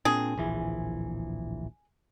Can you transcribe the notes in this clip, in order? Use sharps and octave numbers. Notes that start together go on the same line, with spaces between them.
A#2 C4 D4 G#4
D1 A#1 E3